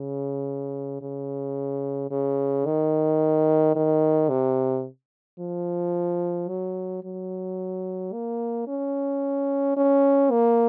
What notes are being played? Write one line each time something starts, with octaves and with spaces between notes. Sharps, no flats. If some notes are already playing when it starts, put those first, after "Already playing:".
Already playing: C#3
C#3
C#3
D#3
D#3
C3
F3
F#3
F#3
A#3
C#4
C#4
A#3